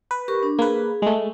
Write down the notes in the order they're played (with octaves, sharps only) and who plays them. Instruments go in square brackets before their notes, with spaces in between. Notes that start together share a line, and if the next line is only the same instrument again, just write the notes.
[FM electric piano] B4
[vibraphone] G4 A#4 C#6
D4
[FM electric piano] A#3 B4 [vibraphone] G#4
[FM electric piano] G#3 A3